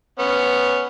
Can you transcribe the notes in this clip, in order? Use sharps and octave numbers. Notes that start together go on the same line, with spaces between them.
B3 C#4